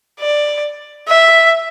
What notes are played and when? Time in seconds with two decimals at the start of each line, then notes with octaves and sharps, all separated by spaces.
0.20 D5
1.08 E5